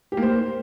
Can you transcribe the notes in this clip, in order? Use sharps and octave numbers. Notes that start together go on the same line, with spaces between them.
G4
A#3
C5